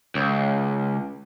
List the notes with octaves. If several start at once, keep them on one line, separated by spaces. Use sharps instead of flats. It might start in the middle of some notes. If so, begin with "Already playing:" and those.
C#2